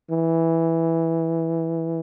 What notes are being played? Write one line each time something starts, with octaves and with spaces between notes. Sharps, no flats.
E3